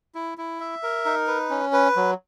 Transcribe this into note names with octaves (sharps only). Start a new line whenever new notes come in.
E4
E4
E5
A#4
D#4
B4
C#4
B4
F#3